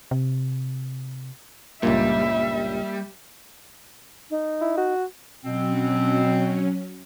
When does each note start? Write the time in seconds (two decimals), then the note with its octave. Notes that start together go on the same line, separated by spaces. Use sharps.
0.11 C3
1.83 C#2 G2 A#2 G3 A#3 E5
4.30 D#4
4.61 E4
4.78 F#4
5.44 B2 F#3 C4 C#4